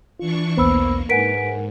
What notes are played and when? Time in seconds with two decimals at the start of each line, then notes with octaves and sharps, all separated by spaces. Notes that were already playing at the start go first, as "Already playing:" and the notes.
0.19 E3 D4 F4 C#6
0.57 B1 E2 A#3 B3 C5 B5 E6
1.09 G#2 A#4 B4 F#5 G#5 B6 D7